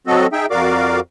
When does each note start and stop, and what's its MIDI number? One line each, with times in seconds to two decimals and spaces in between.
0.07 0.27 54
0.07 0.27 60
0.07 0.27 66
0.07 0.27 69
0.07 0.27 75
0.33 0.46 63
0.33 0.46 68
0.33 0.46 76
0.33 0.46 79
0.51 1.00 41
0.51 1.00 66
0.51 1.00 70
0.51 1.00 74
0.51 1.00 77
0.51 1.00 86